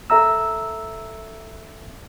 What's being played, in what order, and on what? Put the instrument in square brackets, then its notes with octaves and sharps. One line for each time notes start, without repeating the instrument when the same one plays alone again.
[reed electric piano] A4 E5 A#5 E6